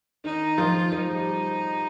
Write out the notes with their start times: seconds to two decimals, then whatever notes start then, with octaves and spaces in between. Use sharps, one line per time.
0.24 D#3 D#4
0.58 F3 F4
0.92 F3 D#4
1.14 G3